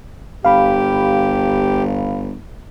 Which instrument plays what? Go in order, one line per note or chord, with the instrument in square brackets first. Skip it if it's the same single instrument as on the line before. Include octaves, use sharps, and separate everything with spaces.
[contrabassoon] G1 [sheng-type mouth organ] G4 [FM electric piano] F5 B5